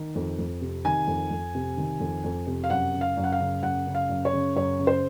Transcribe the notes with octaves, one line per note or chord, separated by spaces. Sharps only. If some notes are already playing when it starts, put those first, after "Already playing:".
Already playing: D#3
F2
F2
C3
D#3 G#5
F2
F2
C3
D#3
F2
F2
C3
F5
F#2 F#5
C#3
F5
F#2
F#5
F5
C#3
F#2 F#5
C#3
F5
F#2
C#5
C#3
F#2 C#5
C#3
C5